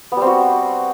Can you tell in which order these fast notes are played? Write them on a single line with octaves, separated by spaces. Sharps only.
B3 G3 C4 F#4